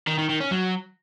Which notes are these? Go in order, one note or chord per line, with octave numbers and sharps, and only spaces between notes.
D#3
D#3
D#3
C#4
F#3